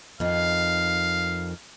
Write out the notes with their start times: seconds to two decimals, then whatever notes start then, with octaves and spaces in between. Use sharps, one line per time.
0.20 F2 D#3 F5